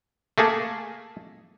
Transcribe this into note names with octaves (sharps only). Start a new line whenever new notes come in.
A3 A#3 G#4 A4